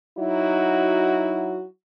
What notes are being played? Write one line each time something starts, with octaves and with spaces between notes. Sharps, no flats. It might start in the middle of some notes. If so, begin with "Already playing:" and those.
F#3 D#4 E4 F#4